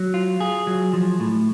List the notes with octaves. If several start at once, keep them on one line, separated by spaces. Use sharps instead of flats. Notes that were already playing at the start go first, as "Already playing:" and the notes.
Already playing: F#3
F4
G#4
F#3
F3
A2